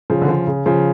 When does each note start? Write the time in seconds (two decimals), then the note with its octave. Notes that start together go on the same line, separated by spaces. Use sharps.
0.10 C#3 F3
0.22 D3
0.28 C#3 F3
0.47 C#3
0.66 C#3 F3